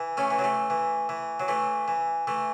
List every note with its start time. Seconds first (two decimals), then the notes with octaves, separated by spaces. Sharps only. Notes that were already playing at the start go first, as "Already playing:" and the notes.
Already playing: E3
0.17 A3 C#4
0.31 E3
0.39 F#3
0.44 A3
0.70 E3
1.09 E3
1.40 F#3
1.48 E3 A3
1.88 E3
2.27 E3 A3